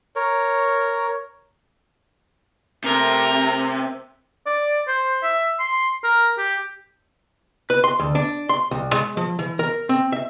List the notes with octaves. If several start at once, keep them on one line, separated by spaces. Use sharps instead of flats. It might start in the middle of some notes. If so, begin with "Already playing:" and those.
A#4 C#5
C3 A3 A#4
D5
C5
E5
C6
A#4
G4
B4
C6
D2
D4
C6
C2
G#3
F3
E3
A#4
C4
E5